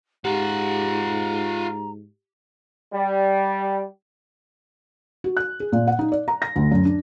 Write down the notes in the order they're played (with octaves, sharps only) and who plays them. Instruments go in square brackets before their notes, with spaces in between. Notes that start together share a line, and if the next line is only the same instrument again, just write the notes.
[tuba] G#2 [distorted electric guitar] F4 F#5 [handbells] G4 [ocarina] A#5
[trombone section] G3
[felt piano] F#4
F#6
G#4
A#2
F#5
D#4
D5
A#5
A#6
D2
F#2
D4